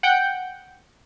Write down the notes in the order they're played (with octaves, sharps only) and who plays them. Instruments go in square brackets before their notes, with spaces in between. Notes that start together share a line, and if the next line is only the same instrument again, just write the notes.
[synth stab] F#5 G5 G6